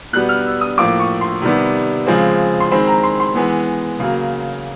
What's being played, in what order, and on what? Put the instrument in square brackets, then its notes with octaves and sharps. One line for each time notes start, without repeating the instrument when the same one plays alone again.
[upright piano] B2 G3 B3 F#6
F6
E6
D#6
A2 F3 A#3 D6
C#6
C6
C3 D#3 G3 B3
C#3 F3 G#3 C4
C6
D#3 G#3 C4 B5
A#5
C6
C6
E3 G#3 B3
C#3 F#3 A#3